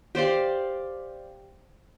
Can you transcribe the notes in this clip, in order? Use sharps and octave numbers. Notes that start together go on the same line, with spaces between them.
G4 C5 D5 F5